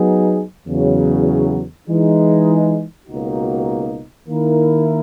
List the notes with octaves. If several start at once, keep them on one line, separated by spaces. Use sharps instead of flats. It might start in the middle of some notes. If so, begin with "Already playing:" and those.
Already playing: F#3 B3 D#4 G#4
E2 C#3 F#3
E3 G#3 D#4
C#2 B2 A#3 D#4 F#4
D#3 A#3 E4 A#4